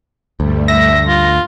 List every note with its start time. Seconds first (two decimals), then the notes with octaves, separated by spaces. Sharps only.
0.40 D2 G2 G3 A3
0.68 E5 A#6
1.08 F4